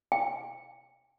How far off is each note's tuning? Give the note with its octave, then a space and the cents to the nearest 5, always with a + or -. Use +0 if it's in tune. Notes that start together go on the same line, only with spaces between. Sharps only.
G5 +35